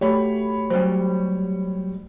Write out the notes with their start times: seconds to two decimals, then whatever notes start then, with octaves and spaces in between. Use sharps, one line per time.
0.01 A3 F#4 G4 C#5 B5
0.70 F#3 G3 C#4 C5